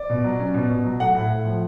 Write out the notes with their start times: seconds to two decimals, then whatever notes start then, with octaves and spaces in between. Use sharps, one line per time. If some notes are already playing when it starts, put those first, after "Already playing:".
Already playing: D5
0.10 B2
0.24 F#3
0.40 C#4
0.54 B2
0.70 B2
0.85 F#3
1.00 A3 F#5
1.15 A2
1.30 A2
1.45 F3